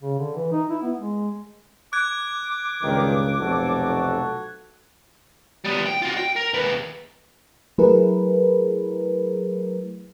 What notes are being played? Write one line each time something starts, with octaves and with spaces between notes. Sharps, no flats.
C#3
D3
E3
D#4
E4
B3
G#3
D6 F#6 G#6
C#2 G2 B2 D#3
F1 B1 F#4 A4
G3 B3
G5
F4 F#4
G5
A#4
D#2 B4
F#3 A3 E4 G#4 A#4 B4